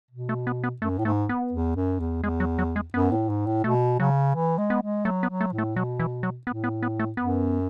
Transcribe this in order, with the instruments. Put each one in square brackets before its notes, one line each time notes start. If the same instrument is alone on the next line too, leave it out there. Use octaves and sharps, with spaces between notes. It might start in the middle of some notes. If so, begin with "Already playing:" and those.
[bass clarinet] B2
[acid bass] A3
B3
B3
[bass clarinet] F#2 [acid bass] A3
[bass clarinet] A2
[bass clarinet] G#2 [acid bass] A3
[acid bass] B3
[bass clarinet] E2
F#2
E2
[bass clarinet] E2 [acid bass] G#3
[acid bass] F#3
F#3
G#3
[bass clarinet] F#2 [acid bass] B3
[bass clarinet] A2
G#2
A2
[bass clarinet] B2 [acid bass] A3
[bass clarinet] C#3 [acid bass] F#3
[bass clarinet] E3
G#3
[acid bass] B3
[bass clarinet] G#3
[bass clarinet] F#3 [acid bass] A3
[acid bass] B3
[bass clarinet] F#3
[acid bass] A3
[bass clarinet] A2
[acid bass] A3
[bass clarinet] B2 [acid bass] F#3
[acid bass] E3
F#3
[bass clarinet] A2 [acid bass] B3
[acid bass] B3
B3
A3
[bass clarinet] F#2 [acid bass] B3